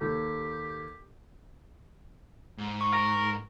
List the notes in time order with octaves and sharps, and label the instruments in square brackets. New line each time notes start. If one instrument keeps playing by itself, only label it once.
[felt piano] D#2 A4 [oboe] G4
[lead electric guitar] G#2
[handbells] C#6
[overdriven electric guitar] A#4